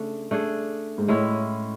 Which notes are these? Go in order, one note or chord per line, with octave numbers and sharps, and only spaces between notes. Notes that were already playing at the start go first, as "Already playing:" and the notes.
Already playing: C#3 A3 D4
A3 D4 G#4
G#2
A2 G#3 C#4 E4